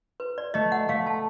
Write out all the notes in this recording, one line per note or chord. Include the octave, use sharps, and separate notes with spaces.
B4
D5
A3 D#5
F#5
A3 F5
A5